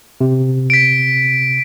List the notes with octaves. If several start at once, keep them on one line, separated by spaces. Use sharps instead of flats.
C3
B6 D7